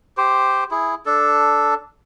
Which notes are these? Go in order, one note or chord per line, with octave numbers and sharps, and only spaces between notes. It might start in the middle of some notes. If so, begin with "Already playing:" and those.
G4 C5
E4 G#4
D4 A4